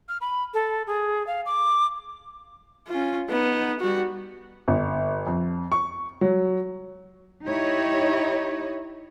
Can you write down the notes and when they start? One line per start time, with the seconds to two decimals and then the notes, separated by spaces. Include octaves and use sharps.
0.09 F6
0.21 B5
0.54 A4
0.87 G#4
1.27 F5
1.46 D6
2.88 C#4 F4
3.30 B3 D#4
3.80 G3 F#4
4.68 G1
5.27 F2
5.72 C#6
6.21 F#3
7.46 D#4 E4 G4 C#5 D#5